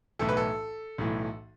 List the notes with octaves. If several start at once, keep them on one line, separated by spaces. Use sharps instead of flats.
B1 A2 E3 A4
B4
A4
B1 A2 E3